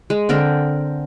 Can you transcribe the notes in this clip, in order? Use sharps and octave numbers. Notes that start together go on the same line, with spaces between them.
G#3
D3 C4 A#4 G5